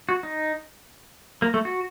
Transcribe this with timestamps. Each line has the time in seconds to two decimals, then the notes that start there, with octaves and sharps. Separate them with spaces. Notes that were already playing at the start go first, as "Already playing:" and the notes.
0.09 F#4
0.23 D#4
1.42 A#3
1.54 A3
1.65 F#4